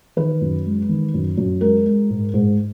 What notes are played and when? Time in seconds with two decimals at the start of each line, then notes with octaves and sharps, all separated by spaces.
0.17 D#3 B4
0.41 F#2
0.65 G#3
0.89 D#3
1.14 F#2
1.37 F#2
1.61 G#3 A#4
1.86 G#3
2.10 G#2
2.34 G#2